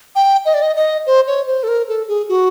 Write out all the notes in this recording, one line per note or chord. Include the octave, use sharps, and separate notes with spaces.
G5
D#5
D5
D#5
D#5
C5
C#5
C5
A4
A#4
A4
G#4
F#4